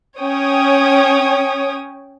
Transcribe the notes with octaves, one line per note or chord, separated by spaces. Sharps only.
C#4 C#5 G5 D#6